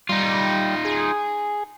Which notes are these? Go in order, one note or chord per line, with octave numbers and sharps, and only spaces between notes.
G3 D#4 F4
G#4